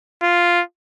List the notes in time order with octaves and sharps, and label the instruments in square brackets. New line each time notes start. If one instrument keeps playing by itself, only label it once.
[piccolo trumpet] F4